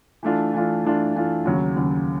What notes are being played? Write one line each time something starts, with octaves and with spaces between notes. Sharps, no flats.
E3 A3 D4 F4
E3 A3 D4 F4
E3 A3 D4 F4
E3 A3 D4 F4
D#2 C#3 F#3
D#2 C#3 F#3